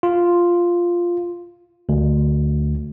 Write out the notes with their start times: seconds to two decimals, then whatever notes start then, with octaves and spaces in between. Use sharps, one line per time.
0.03 F4
1.89 D2